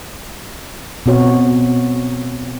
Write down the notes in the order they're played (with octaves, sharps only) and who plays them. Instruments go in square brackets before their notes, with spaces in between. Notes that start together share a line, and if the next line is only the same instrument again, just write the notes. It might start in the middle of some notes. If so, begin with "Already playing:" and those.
[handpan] B2 C4 F#4 C#5